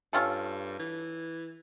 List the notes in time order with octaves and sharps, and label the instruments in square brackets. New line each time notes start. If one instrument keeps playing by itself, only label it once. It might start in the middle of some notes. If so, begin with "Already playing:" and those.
[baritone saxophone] G2 [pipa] C#4 F4 A4
[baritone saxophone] E3